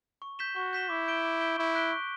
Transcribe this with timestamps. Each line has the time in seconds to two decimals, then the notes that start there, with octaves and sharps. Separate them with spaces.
0.22 C#6
0.39 G6 B6 E7 G7
0.56 F#4 C#6
0.73 G6 B6 E7 G7
0.90 E4 D6
1.08 G6 D7 G7
1.24 D6
1.41 G6 D7 G7
1.58 E4 C#6
1.75 F#6 B6 D7 G7
1.92 C#6